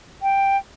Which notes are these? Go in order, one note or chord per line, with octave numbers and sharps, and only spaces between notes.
G5